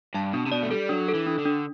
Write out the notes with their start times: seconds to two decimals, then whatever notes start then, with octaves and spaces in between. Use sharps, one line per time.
0.14 G2 A5
0.33 B2 D4
0.46 C3
0.52 B2 D5
0.63 A3
0.71 G3 A4
0.89 F#3 D4
1.08 A4
1.14 E3
1.27 D4
1.38 D3
1.46 D4